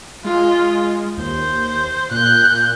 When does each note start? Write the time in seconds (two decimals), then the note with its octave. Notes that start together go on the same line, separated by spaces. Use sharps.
0.24 G#3 F4
1.17 D#2 C5
2.11 A#2 F#6 G6